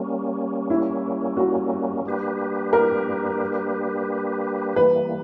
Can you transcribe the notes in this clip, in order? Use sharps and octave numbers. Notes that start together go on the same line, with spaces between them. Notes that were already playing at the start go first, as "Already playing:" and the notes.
Already playing: G3 A#3 C#4
E4
F#4
G3 A#3 D4 G4 B4
A#4
E3 G3 A#3 B4